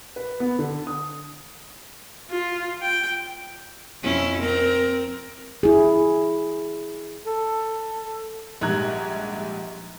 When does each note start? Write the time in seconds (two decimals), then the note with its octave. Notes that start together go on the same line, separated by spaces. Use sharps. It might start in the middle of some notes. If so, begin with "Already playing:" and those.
0.16 B4
0.40 B3
0.59 D3
0.87 D#6
2.31 F4
2.82 G5
4.03 F2 C#4 E4
4.40 C4 A#4
5.63 E4 G#4
7.26 A4
8.61 A#1 G#2 G3 A#5 F#6 G#6